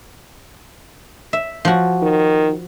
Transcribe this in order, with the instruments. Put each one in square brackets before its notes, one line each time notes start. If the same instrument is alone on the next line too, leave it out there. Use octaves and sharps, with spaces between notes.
[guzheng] E5
F3 F#4
[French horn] D#3